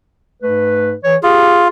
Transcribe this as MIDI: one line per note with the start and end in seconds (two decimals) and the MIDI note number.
0.43 0.94 44
0.43 0.94 57
0.43 0.94 71
1.04 1.16 52
1.04 1.16 73
1.23 1.68 65
1.23 1.67 67
1.23 1.67 68